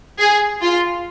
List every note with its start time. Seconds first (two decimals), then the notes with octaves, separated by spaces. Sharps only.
0.19 G#4
0.62 F4